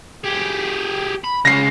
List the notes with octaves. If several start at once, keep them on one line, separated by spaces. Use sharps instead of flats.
G4 G#4
B5
C#3 G#3 A#6 C7